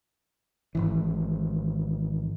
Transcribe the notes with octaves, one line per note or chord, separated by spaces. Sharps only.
G#1 C#2 E3